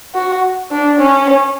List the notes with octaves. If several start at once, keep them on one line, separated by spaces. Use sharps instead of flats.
F#4
D4
C#4